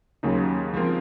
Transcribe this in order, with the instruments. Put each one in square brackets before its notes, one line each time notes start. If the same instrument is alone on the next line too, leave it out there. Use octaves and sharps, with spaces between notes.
[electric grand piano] D#2 C#3 F#3 A#3 D#4
F3 G#3 C4 F4 A#4